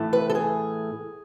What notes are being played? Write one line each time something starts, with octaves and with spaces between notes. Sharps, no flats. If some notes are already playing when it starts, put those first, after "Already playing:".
Already playing: A2 E3 A3
B4
A4
G#4